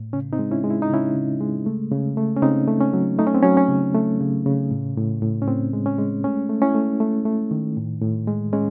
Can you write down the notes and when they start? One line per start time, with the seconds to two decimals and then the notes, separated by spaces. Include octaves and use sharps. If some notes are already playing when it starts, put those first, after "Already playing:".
Already playing: A2
0.13 C#3 C#4
0.33 C4 D#4
0.39 G#3
0.51 C#4 E4
0.64 G#3
0.70 E4
0.82 D#4
0.90 C#3 C#4 E4
1.15 C#3
1.41 G#3
1.66 A3
1.92 C#3
2.17 A3
2.36 C#4
2.42 C#3 C4 D#4
2.67 A3
2.81 C#4
2.93 F#3
3.19 A3 D#4
3.27 C#4
3.34 C4
3.42 F#3 C#4
3.57 C#4
3.69 C#3
3.95 A3
4.20 C#3
4.46 C#3
4.71 A2
4.97 A2
5.22 A2
5.42 C#4
5.48 A2 C4
5.73 G#3
5.86 C#4
5.98 G#3
6.24 A3 C#4
6.49 A3
6.62 C#4 E4
6.75 A3
7.00 A3
7.25 A3
7.51 D#3
7.77 A2
8.02 A2
8.27 G#3
8.53 G#3 C#4